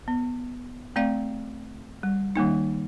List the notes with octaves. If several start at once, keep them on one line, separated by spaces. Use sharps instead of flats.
B3
A3 C4 D5 F5
G3
D#3 G3 A#3 D#4